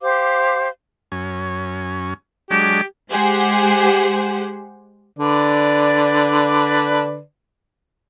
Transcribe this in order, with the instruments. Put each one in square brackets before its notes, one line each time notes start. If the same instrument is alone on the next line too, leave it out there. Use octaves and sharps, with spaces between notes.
[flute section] G4 C5 F5 D6
[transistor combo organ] F#2 C#4
[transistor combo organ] F#3 G#3 D4 [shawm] G4
[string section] G#3 G4 G#4 C5 F#5
[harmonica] D3 B4 D5